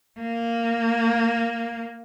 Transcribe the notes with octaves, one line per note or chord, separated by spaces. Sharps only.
A#3